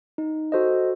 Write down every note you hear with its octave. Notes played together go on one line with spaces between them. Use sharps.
D#4
F#4 A4 C5 D#5